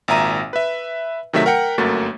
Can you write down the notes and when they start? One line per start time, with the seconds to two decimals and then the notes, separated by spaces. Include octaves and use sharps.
0.08 G#1 A#2 E5 A#5 D#7
0.53 B4 E5
1.33 C3 D#3 F#3 A3 E5 B6
1.46 A#4 F#5 G5 C#7
1.78 G1 F#2 A3 A#3 F#4 A6